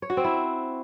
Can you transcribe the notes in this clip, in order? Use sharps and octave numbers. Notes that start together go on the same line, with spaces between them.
C#5
F#4
C4
E4